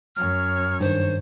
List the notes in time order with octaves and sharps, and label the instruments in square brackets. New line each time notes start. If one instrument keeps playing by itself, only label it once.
[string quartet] F#2 C#5 [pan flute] F6
[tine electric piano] G2 D#3 [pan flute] C5